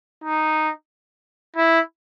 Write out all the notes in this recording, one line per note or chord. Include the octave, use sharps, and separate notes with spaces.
D#4
E4